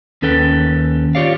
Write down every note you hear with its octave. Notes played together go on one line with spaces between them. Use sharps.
D#2 C#4 A4 B4 G5
F4 G4 C#5 D5 F5